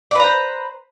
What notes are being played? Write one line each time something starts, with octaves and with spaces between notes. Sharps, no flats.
B4 C5 D5 A#5